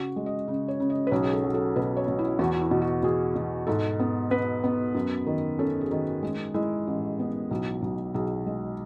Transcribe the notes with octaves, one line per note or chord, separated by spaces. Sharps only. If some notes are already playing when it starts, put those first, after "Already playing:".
Already playing: C#3 F#4
G#3
D#5
C#3
C#5
C#3
D#5
B4
B1 C#5
G#4
A4
F#3
A4
B2 B4
C#5
B2
E4
E2 F#4
F#4
E4
B2
F#4
B2 G#4
B2
G#2 A4
B3
B3 B4
B3
F#2
D#3
C#4 A4
G#4
D#3
G#3
G#3 E4
A1
B3
B1
B1
B1 G#4
G#3